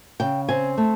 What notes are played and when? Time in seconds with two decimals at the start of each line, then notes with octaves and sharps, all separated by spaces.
0.20 C#3 G5
0.49 C4 G#5
0.78 A3